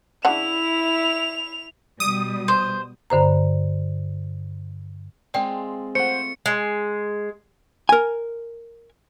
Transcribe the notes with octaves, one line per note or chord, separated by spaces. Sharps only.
C#3 D4 E4 F#5 F7
B2 G3 D#6
C5
G2 D3 C5 A#5
G#3 C4 F4 D5 G5
A3 F4 C5 F#5 C#7
G#3
A#4 G#5